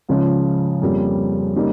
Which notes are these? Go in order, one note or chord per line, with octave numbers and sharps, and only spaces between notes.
C#2 C#3 F3
F2 C#3 G3 A#3
C#3 G3 A#3 D#4